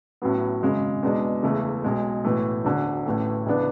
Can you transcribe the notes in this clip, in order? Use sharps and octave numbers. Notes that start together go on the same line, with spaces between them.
A1 A2 F#3 B3
G#1 F#2 C#3 G#3
E2 B2 G#3 D4
F#1 E2 C#3 E3 A3
B1 B2 G#3
B1 A2 E3 A3
E1 D2 D3
A1 A2 E3 A3
C#2 C#3 E3 B3 D4